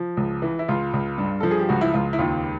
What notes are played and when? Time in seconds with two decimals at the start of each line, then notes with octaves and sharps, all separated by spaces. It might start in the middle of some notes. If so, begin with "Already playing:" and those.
Already playing: F3
0.17 C#2
0.42 E3
0.59 E4
0.68 C#2 F4
0.94 C#2
1.18 G2
1.40 F3 A4
1.51 G#4
1.60 G4
1.69 C#2 F#4
1.81 E4
1.93 C#2 F4
2.13 E4
2.19 D#2 F4